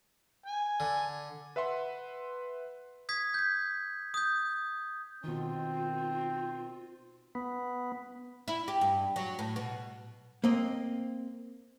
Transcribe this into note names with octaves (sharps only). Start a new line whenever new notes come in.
G#5
D3
B4 E5 F#5 C6
D#6 G#6 B6
G6 B6
D#6 G6
B2 D#3 C4 F4
B3
E4
G4
G2
F#3
A2
B2
A#3 C4 D#5